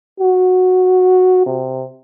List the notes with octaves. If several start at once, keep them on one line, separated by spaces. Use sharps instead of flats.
F#4
C3